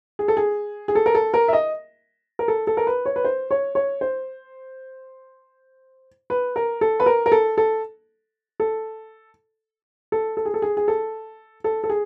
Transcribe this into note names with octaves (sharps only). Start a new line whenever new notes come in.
G#4
A4
G#4
G#4
A4
A#4
A4
A#4
E5
D#5
A#4
A4
A4
A#4
B4
C#5
B4
C5
C#5
C#5
C5
B4
A#4
A4
B4
A#4
A#4
A4
A4
A4
A4
A4
G#4
A4
G#4
G#4
A4
A4
A4
G#4